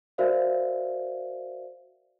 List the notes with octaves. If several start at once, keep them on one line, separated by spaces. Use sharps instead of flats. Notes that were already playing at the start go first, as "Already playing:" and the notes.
F#4 A#4 C5 D5 E5 F5